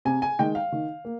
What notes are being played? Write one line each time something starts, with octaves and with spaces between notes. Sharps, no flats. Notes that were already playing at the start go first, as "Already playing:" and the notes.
C3 G#5
G#5
D#3 G#3 G5
F5
D#3
A#3